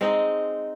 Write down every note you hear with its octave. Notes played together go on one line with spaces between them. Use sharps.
G#3 C4 D#4